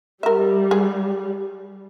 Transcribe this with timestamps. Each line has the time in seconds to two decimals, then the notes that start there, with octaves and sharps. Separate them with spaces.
0.23 G3 A#4 E5
0.71 G#4